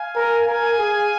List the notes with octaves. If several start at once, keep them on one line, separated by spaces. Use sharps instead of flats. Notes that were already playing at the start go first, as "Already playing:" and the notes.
Already playing: F5 G#5
A#4
A#4 F5 G#5
G#4